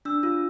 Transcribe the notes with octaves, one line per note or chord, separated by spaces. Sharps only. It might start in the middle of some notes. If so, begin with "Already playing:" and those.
D4 E6
F4